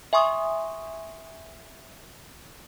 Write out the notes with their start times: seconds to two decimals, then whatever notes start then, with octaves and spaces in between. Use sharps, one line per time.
0.13 E5 G#5 C6 C#6 D#6